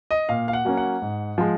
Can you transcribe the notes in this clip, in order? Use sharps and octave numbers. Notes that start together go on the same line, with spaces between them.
D#5
A#2 F5
F5
F#5
F#3 A#3 C#4
F#5
G#2
F3 G#3